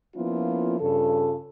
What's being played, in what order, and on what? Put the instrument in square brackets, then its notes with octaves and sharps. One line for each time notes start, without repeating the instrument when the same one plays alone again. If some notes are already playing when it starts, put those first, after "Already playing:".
[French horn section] F3 A#3 B3 C#4 E4 F4
G2 C#3 F4 A4